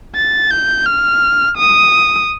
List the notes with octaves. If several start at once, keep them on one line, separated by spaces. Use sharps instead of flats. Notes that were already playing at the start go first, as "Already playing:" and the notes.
A6
G6
F6
D#6